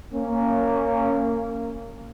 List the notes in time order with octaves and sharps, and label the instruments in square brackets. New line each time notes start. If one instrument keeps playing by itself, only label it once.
[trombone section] A#3 C#4